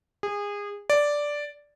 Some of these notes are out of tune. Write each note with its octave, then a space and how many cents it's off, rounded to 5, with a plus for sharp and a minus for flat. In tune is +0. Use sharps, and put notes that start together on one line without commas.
G#4 -25
D5 -5